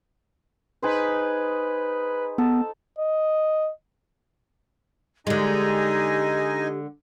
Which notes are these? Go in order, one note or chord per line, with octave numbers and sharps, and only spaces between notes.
D#4 G#4 B4 C5
B3 A4
D#5
D3 G#3 D#4 G4 D#5 G#5